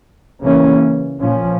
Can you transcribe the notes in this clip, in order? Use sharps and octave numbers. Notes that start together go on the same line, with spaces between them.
C#3 E3 A#3 C#4
A#2 F3 C#4